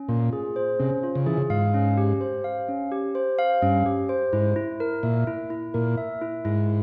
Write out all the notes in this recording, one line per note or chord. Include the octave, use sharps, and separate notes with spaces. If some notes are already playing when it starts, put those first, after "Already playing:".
Already playing: C#4
A#2 F4
G#4
C5
C3 C#4
F4
C#3
E3 G#4
C#3
G#2 F5
C#4
G4
C5
F5
C#4
G4
C5
F5
G2 C#4
G4
C5
G#2 E4
E4
A#4
A#2 E5
E4
E4
A#2 A#4
E5
E4
G#2 E4